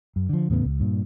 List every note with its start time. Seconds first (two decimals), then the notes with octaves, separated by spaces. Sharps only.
0.16 F#2
0.29 D3 F3
0.50 E2 A2 C#3 B3
0.65 C#2
0.80 G2 A#2